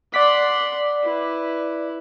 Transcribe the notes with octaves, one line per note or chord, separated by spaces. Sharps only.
D5 F#5 C6 D6 B6
E4 B4